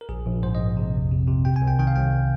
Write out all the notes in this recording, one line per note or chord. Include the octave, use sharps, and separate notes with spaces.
A#4
A#1 G#4
A#1
G#2 C5
D#5
A#1
C3
F2
C3
C3
C3 G5
G#5
C2
G5
D#3 G5
F5
C2 G5